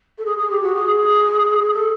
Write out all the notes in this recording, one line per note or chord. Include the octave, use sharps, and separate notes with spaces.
A4
G#4
G#4
G4
F#4
G#4
A4